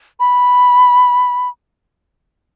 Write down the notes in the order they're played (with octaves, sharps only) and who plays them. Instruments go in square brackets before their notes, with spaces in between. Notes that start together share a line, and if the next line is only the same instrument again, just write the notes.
[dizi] B5